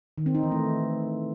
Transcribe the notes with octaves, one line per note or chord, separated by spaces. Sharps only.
D#3
C4
D#4
E3
A3